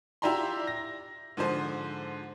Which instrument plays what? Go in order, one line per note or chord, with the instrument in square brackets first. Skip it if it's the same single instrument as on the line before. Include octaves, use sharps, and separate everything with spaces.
[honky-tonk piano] E4 F4 G4 D5 A#5 C6
A#6
G#2 D3 F3 C5